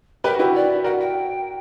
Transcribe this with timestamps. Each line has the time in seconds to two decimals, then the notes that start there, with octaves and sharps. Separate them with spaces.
0.24 G4 A#4 B4
0.34 F#4
0.39 E4 G4 B4
0.55 D5
0.84 F#4 A#4 F#5
1.00 G5